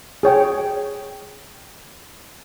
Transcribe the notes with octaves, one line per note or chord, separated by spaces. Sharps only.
G#4 C#5 G5